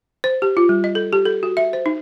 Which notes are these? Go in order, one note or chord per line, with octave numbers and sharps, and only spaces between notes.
C5
G4
F4
G3
D#5
A4
G4
A4
F#4
E5
C5
D#4